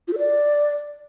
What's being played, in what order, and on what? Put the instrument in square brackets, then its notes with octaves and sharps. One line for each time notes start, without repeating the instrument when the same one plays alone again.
[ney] F4
A4
D5